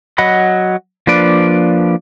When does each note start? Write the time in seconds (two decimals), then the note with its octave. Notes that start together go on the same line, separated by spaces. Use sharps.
0.18 F#3 D#5 F#5 B5
1.07 F3 A#3 D4 B4 D5